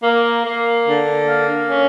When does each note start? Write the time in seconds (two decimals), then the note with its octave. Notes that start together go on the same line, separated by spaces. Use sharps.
0.03 A#3
0.44 A#3
0.86 D3
1.26 A#3
1.68 C#4